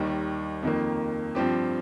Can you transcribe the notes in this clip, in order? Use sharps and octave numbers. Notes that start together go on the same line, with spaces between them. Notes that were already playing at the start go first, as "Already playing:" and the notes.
Already playing: D#2 D#3 G3
F2 D#3 A#3
G2 F3 C4 G4